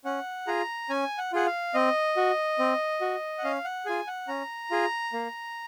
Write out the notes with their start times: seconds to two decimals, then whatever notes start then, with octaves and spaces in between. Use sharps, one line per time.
0.05 C#4 F#5
0.47 F4 G#4 A#5
0.90 C#4 G#5
1.18 F#5
1.33 F4 G#4 F#5
1.46 F5
1.74 C4 D#5
2.17 F#4
2.59 C4
3.01 F#4
3.38 F#5
3.44 C#4 F5
3.65 F#5
3.86 F4 G#4 G#5
4.07 F#5
4.28 C#4 A#5
4.71 F4 G#4
5.13 A#3